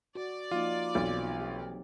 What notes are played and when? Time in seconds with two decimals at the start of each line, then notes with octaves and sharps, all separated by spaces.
0.15 F#4 D5
0.51 F3 A#3 D#4 F4
0.95 B1 E3 F#3 C4
1.40 G4